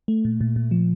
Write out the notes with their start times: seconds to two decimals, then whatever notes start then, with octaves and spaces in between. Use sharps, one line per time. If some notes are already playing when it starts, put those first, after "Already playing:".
0.08 A3
0.25 A#2
0.41 A#2
0.56 A#2
0.71 F3